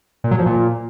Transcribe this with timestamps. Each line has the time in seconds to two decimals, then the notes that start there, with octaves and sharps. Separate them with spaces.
0.24 A#2
0.31 F#3
0.39 F3
0.46 A#2